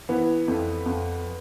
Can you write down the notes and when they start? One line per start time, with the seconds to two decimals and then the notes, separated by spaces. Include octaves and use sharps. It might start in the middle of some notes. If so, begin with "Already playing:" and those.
0.09 E3 B3
0.48 F2
0.86 F2